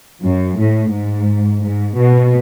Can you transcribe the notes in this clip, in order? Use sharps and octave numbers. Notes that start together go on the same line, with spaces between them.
F#2
A2
G#2
G#2
B2